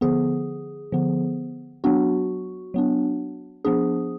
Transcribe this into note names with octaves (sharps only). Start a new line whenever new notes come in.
D3 F3 B3 G#4
D3 F3 B3
F#3 B3 D4 F#4
F#3 B3 D4
F3 B3 D4 G#4